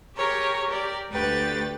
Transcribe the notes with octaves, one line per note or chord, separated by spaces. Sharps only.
G4 G#4 A#4 C#5
G4 A#4 D5
D2 A3 G4 B4 G5 A6